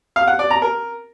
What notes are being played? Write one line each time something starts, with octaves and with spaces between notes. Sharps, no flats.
F5
F#5
D5
A#5
A#4